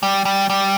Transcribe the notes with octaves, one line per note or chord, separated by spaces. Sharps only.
G3
G3
G3